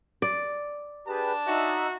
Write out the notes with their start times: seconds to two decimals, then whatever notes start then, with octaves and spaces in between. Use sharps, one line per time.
0.22 D5
1.08 D4 G4 G#4 B4 A5
1.47 D#4 F#4 E5